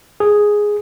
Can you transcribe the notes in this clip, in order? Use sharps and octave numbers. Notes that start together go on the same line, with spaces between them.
G#4